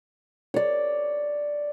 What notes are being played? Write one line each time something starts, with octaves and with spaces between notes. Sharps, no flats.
C#5 D5